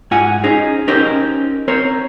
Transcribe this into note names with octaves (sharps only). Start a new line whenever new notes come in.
G#2 F4 F#5 G#5
C#4 D#4 G#4 C5
C#4 D#4 G4 A#4 C5
C4 A#4 C5 C#5